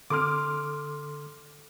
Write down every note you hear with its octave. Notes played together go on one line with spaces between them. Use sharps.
D3 A4 C6 D6 D#6 F6